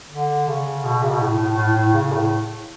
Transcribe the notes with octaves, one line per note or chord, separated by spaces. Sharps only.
D3
C#3
B2
C#3
B2
A2
A2
A2
A2
C#3
A2